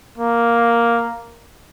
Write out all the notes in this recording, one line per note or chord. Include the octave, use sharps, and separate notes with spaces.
A#3